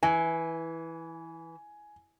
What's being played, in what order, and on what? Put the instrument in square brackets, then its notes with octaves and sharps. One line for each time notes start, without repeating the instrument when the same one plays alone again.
[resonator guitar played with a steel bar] E3 [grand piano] G#5